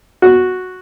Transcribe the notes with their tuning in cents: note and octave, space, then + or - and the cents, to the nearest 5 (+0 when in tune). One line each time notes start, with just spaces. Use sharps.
F#4 -5